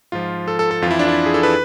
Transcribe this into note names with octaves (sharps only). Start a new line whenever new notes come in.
G#2 F3 F4
A4
A4
A4
F2 E3 E4 F4
D4
E4
G#4
A4
B4